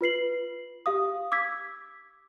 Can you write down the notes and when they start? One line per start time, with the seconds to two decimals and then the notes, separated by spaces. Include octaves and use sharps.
0.01 F4 B4 C7 F#7
0.86 G4 F5 D#6
1.32 D6 E6 G#6 B6